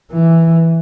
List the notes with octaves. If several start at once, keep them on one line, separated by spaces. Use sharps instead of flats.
E3